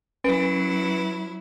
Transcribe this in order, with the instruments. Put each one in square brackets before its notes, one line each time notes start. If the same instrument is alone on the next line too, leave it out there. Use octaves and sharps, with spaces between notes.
[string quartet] F#3 E4 [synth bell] C#4 B4 D7